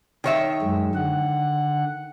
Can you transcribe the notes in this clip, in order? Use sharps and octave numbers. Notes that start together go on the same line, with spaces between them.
D#3 C#5 E5
F#2 G#3
D3 F#5